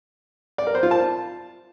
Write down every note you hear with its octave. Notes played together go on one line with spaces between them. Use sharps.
D5
A#4
C5
F4
A5